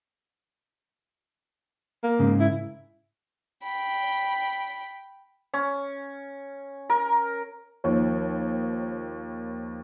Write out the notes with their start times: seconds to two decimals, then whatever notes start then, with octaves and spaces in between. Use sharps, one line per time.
2.04 A#3
2.19 G#2 C#3
2.40 E4
3.63 G5 B5
5.54 C#4
6.89 A#4
7.84 D#2 F3 C#5